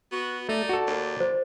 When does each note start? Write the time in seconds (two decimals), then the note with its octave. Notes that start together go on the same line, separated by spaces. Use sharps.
0.12 B3 F#4
0.49 A3 D#4 D5
0.69 F#4 A4
0.87 D#2
1.20 C5